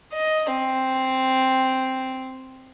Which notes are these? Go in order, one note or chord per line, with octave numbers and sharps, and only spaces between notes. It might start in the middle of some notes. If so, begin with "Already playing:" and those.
D#5
C4